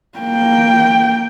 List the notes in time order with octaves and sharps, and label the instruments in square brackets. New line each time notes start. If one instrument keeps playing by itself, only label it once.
[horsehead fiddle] A#3 G5